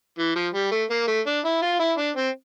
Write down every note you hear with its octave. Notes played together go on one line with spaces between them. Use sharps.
E3
F3
G3
A3
A#3
A3
D4
E4
F4
E4
D4
C4